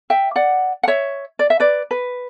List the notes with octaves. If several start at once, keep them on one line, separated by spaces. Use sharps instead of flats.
E5 G5
D5 F#5
F#5
C#5 E5
D5
E5
B4 D5
B4